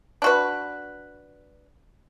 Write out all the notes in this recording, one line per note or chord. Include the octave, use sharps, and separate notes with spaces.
D4 F#4 B4